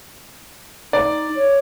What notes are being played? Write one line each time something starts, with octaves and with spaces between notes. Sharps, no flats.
D#4 D5
C#5